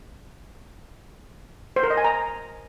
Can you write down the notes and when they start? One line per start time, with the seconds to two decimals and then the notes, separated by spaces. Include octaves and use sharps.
1.76 C5
1.83 A#4
1.90 D#5
1.97 G#5
2.04 A#5